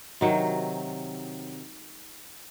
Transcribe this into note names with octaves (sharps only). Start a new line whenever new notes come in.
C3 D#3 F#3